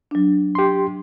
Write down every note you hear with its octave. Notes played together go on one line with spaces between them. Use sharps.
F#3 D4
G4 C6